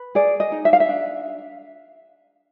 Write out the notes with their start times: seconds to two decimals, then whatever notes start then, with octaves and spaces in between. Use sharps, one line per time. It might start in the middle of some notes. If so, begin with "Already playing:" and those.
Already playing: B4
0.15 G#4 D5
0.40 D#5
0.52 D#4
0.65 E5
0.73 F5
0.80 E5
0.89 D4